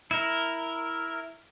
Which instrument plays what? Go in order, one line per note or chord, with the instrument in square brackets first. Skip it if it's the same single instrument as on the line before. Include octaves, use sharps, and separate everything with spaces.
[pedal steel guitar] E4 A#4